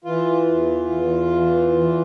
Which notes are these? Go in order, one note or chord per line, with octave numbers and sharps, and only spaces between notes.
E3 F4
E2
E2
E3
E3